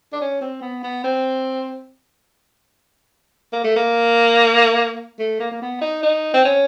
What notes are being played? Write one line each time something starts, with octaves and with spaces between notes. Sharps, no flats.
D4
C#4
C4
B3
B3
C4
A#3
A3
A#3
A3
A#3
A#3
B3
D#4
D#4
C4
C#4